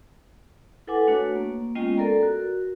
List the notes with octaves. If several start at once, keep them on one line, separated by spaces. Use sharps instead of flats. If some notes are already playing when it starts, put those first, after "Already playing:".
E4 A4 B4 F#5 G#5 D6
A3 D4 F#4 B4 C#5
A#3
G#3 B3 C#4 F4 D#5 G5
A4 A#4 D5 A#5
F#4 A#4